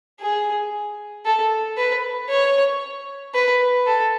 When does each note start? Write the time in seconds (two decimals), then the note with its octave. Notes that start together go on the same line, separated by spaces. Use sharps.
0.20 G#4
1.25 A4
1.77 B4
2.29 C#5
3.34 B4
3.87 A4